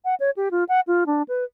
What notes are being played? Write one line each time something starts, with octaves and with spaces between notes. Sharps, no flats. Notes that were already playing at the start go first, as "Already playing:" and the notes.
F#5
C#5
G4
F4
F#5
F4
D4
B4